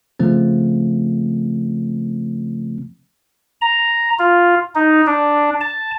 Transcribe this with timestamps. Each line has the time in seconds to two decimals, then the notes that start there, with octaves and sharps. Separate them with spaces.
0.19 C#3 F3 A3 C4
3.62 A#5
4.19 F4
4.75 D#4
5.07 D4
5.61 A5